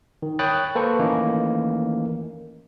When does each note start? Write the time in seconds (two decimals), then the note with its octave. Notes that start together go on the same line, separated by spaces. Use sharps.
0.22 D#3
0.39 C#5 G5 B5 D#6 F#6 A6
0.75 A#3 A4 B4 C5 C#6
0.99 D#3 E3 A3 A#3 C#4 D#4